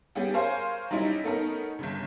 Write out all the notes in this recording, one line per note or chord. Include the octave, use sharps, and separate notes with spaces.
G3 B3 C#4 G4 G#4
G#4 A#4 C5 C#5 F5 G#5
F#3 G3 C#4 D#4 E4
A3 B3 C#4 D#4 A#4
G1 G2 C#3